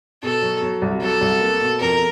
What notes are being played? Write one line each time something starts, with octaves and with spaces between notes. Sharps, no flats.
B2 A4
F#3
F#3
C2
F#3 A4
C2
A#3
B2
F2 A#4